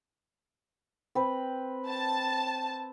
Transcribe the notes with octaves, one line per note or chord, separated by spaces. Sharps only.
C4 B4
A5